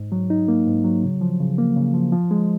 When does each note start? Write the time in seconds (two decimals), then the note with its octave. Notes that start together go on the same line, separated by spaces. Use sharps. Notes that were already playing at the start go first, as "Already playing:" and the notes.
Already playing: G#2
0.12 F#3
0.30 D#4
0.48 A#3
0.67 G#2
0.85 F#3
1.03 C#3
1.21 F3
1.40 C#3
1.58 A#3
1.76 C#3
1.94 F3
2.13 F3
2.31 G#3